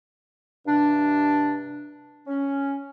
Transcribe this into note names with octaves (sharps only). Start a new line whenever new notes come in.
G2 C3 D4
C#4